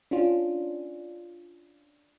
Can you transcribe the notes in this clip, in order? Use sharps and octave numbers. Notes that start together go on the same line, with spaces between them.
C#4 D4 F4